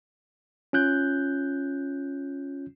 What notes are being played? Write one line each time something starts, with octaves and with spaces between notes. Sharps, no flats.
C#4 F4 F#6 G6